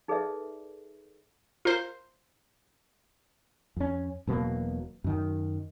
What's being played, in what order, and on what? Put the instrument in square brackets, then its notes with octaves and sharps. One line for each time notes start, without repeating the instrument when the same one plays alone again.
[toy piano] D#4 G#4 A4 B4 D5 E5
[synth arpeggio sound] F4 A#4 C5
[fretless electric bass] F2 C#4
E1 B2 F#3 A#3
F#2 D#3